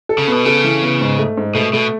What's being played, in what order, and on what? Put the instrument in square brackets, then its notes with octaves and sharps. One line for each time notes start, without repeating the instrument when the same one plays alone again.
[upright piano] A4
[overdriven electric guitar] C#3
[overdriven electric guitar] B2 [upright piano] B3
[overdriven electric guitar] C#3 [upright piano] A4
[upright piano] E3
B3
G#2
A3
G#2
[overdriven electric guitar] B2 [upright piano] A3
[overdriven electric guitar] B2 [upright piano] A3